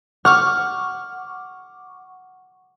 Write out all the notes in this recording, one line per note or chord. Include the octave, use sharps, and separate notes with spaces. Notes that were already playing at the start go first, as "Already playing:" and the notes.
F#5 C#6 D6 F6